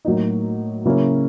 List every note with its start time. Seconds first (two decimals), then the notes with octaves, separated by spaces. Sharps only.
0.05 A2 F#3 A#3 D#4
0.85 C#3 F#3 A#3 C#4 E4